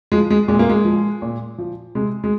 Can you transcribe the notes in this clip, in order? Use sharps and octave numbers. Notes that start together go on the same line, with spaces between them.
F3 G#3
G#3
A#2 G#3
A#3
G#3
F3
A#2
F3
C3 G#3
G#3